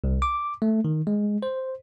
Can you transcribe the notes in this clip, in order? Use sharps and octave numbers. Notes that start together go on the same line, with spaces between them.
C2
D6
A3
D#3
G#3
C5